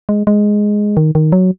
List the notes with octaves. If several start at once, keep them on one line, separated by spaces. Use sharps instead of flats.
G#3
G#3
D#3
D#3
F#3